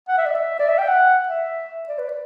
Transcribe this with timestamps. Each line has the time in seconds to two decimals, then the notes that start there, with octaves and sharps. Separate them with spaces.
0.09 F#5
0.18 E5
0.26 D5
0.35 E5
0.59 D5
0.69 E5
0.79 G5
0.89 F#5
1.28 E5
1.89 D5
1.99 B4
2.09 D5